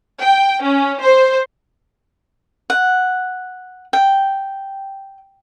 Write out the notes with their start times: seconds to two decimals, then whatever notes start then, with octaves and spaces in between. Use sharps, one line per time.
0.22 G5
0.63 C#4
1.02 C5
2.70 F#5
3.93 G5